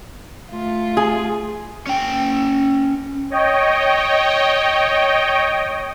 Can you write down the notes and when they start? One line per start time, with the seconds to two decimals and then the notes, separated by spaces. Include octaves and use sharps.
0.49 A3 F4
0.97 G#4
1.87 C#4 G5
3.30 C#5 D#5 G5